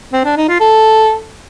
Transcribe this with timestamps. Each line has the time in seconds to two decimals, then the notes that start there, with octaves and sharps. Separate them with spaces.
0.13 C4
0.25 D4
0.37 D#4
0.48 F4
0.60 A4